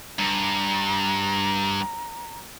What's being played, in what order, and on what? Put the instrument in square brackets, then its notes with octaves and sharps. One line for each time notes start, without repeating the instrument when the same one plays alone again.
[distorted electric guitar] G2 [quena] A#5